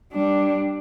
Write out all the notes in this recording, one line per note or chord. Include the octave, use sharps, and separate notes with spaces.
G3 D4